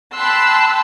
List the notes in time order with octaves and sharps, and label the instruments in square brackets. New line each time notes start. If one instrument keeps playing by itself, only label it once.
[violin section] G5 A5 B5 C6 E6 F#6